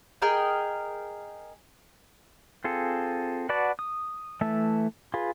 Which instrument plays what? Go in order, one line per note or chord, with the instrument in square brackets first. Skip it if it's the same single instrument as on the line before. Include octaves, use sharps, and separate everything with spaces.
[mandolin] G#4 A#4 D#5 G5
[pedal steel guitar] C4 F4 G#4 A4
F#4 B4 D5 F#5 A5
D#6
E3 A3 E5 A5
F4 G#4 B4